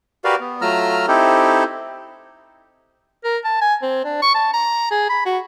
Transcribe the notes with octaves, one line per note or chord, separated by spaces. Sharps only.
F#4 G4 A#4 B4 D5 F5
B3
F#3 A3 F4 A#5 E6 F6
C4 D#4 E4 G4 A4 C5
A#4
A5
G#5
C4
D4
C#6
A5
A#5
G#4
B5
F#4